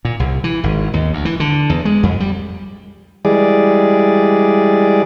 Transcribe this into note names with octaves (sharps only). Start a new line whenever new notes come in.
A#2
C2
E3
G#1
D#2
D2
E3
D3
E2
G#3
F2
G3
E3 G3 G#3 G#4 D5